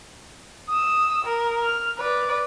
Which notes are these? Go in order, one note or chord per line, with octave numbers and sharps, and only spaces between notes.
D#6 E6
A#4
F6
B4 D5